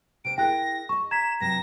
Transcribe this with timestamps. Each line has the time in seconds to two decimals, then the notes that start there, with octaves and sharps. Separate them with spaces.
0.25 C3 C5 D7
0.38 E4 G#4 A#4 G5 F#6 A#6
0.89 D#5 A5 C#6
1.11 A#5 G#6 B6 E7
1.40 G2 C3 F#3 A#6 E7